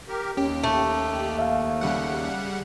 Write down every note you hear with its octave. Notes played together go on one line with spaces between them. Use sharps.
G4 A#4
D#2 C#4 G4
A3
E5 F5
C#3 G3 F#5